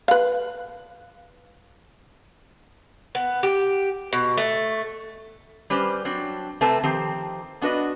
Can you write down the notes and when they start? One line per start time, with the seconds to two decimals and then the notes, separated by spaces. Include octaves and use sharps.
0.08 B4 F5
3.15 B3
3.43 G4
4.13 B2
4.37 A3
5.70 G3 C#4 G4 B4 C5
6.05 F#3 C4 D4
6.61 C3 A3 C4 A4 B4 A5
6.83 D#3 F3 C4 G4
7.61 B3 D4 F#4 B4 D#5